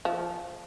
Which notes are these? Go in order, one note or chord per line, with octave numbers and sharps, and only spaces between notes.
F3